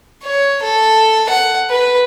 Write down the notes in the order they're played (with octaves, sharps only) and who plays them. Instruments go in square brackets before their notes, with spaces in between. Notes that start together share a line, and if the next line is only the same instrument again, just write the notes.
[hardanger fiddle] C#5
A4
F#5
B4